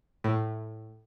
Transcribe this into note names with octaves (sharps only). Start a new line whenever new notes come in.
A2